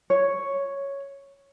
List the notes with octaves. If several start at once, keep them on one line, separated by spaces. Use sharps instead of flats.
C#5